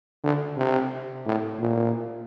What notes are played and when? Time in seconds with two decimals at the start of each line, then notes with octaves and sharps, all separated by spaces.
0.24 D3
0.57 C3
1.26 A2
1.60 A#2